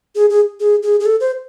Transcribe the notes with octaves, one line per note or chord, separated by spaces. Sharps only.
G#4
G#4
G#4
G#4
G#4
A4
C5